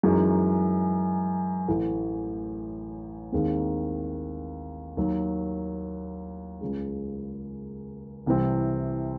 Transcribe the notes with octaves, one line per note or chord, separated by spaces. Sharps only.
F#2 E3 G#3 D#4 F#4
A1 A2 E3 A3
D#2 D#3 G#3 C4
D#2 D#3 F#3
C#2 C#3 G#3
C2 C3 E3 C4